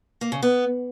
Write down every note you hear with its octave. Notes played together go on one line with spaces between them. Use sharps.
A#3
C#3
B3